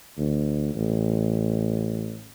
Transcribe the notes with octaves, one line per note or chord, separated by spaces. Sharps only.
D2
A1